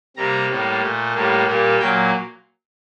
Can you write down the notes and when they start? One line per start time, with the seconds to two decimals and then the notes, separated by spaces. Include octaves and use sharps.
0.17 C3 G3 A#3 A#5
0.48 A2 G3 A#3
0.81 A#2 A3
1.14 A2 G3 A#3
1.46 A#2 G3 A#3
1.79 A#2 F#3 A#3 G5